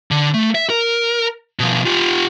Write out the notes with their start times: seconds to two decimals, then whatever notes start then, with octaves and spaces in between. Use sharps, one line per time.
0.11 D3
0.34 A3
0.55 E5
0.70 A#4
1.59 B2 F3
1.86 F4 G4